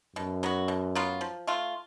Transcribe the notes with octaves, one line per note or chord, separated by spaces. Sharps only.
F#2 B2
F#3 B3 F#4
B2
F#3 B3 F4
F3
A3 F4